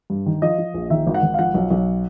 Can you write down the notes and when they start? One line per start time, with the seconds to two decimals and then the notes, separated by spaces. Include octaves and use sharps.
0.10 G2
0.26 D#3
0.42 F3 D#5
0.58 F3
0.74 A#1
0.90 D#3 E5
1.07 G#1
1.15 F#5
1.22 G#1
1.34 F5
1.39 F3 F#5
1.54 B1
1.71 B1